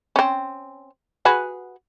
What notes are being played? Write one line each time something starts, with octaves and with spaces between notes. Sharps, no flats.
C4 C#4
F#4 G#4 B4